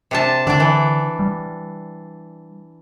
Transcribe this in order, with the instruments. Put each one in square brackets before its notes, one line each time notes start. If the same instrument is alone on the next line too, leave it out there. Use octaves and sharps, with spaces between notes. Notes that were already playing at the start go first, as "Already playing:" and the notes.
[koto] C3 D4 A5
[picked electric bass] D3 [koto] D4 D5
[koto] E3
[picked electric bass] G3